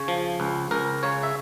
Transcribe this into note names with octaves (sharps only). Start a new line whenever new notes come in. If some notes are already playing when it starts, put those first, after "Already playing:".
Already playing: C#3 C#5
F3
C#2
C#2 A#4
C#3 C#5
E5